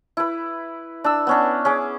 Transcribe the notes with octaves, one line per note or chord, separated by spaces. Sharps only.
E4 B4
D4 E6
B3 C#4 D4
C#4 G#4 D6